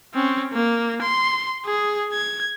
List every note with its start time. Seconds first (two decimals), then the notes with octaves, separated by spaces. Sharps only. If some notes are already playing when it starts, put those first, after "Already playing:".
0.14 C4 C#4
0.53 A#3
1.02 C6
1.65 G#4
2.12 G#6